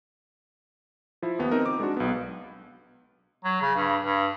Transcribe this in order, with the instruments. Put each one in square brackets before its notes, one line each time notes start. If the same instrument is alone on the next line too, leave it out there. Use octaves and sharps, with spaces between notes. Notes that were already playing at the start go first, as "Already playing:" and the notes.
[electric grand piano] F3 E4
D#2 B3
C4 D#4 A#4
D6
G#3 D4 F#4
B1 B3
[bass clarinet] F#3
C#3
G2
G2